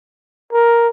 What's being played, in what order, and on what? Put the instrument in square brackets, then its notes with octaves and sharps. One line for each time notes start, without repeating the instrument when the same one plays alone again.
[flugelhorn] A#4